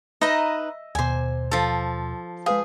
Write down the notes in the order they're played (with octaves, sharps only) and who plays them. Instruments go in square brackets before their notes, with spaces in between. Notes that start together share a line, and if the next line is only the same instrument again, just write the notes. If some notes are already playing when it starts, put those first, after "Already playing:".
[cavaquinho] D#4 B4 A#5 [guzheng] D#5 E5
[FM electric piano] D#2 B2 [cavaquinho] C5 G#5
[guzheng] F3 A4
[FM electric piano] G#3 B4 F5 [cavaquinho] G#4